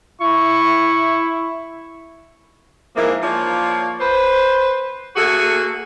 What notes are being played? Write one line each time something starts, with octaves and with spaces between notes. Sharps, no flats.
E4 C#6
G#2 E3 F3 A#3
F3 A#3 F4 C#5 D5
B4 C5
A3 A#3 F#4 G#4 A4